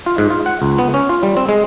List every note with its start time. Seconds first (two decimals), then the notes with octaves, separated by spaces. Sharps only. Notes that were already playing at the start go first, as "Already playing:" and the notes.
0.06 F4
0.18 G#2
0.30 F4
0.46 F#5
0.62 C#2
0.78 B3
0.94 C#4
1.09 F4
1.23 G3
1.37 C4
1.49 G#3